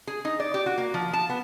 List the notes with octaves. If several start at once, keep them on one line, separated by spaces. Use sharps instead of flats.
G#4
D#4
D5
G4
F#4
A#3
F3
A5
B3